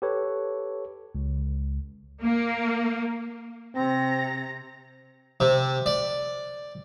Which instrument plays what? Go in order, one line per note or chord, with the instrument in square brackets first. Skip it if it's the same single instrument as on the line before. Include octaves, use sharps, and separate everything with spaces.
[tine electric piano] G4 A4 B4 C#5
C#2
[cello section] A#3
[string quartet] C3 A#5 A#6 [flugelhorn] C4
[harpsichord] C3
D5